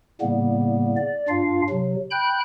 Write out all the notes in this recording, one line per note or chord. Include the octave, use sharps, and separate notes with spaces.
A2 C#3 G3 A#3 B3
D5
G2 D4 F4 F5
C3 F#3
G5 B5 F#6 G6